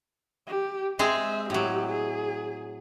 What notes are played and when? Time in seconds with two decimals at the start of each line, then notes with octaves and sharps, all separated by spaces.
0.47 G4
0.99 G#3 C4 G#4 E5
1.50 A2 F#3 G4
1.89 G#4